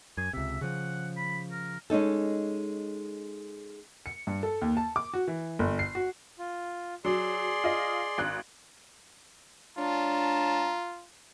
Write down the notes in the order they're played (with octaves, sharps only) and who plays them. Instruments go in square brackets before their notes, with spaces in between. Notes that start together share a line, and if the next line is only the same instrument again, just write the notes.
[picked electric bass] F#2 [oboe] G#5
[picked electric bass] C#2 C3 [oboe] E5
[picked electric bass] C#3 F3 [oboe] F#5
[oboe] B5
A#4
[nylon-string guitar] G#3 C#4 D#4 A4
[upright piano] C#7
G2
A4
D#2
A5
D6
F#4
E3
G1
C7
F#4
[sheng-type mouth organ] F4
[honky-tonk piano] F#3 [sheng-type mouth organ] G#4 D5 C6
[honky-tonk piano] F4 D#5
G#1 F#6
[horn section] G#3 C#5 A5 [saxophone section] D4 [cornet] F4 [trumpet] A#5